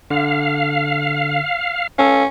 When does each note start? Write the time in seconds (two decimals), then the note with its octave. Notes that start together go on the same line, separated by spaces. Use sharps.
0.10 D3 F5
1.98 C#4 A4 F5